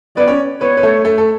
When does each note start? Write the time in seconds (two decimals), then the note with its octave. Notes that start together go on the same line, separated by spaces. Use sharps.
0.17 B3 B4 D5
0.28 C#4 C#5
0.61 B3 B4 C#5
0.77 B4
0.83 A3 A4
1.04 A3 A4
1.18 A4